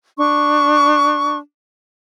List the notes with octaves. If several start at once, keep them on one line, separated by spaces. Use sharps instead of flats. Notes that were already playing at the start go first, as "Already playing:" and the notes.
D4 C#6